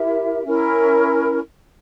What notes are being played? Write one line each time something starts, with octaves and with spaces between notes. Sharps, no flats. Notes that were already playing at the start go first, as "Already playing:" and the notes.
Already playing: E4 G4 A#4 E5
C#4 E4 A#4